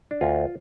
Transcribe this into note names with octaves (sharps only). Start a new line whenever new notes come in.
D4
D2 F4